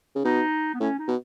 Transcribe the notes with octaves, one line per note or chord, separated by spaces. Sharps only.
C#3
B2 D#4
B3
A2 C#4
D#4
B2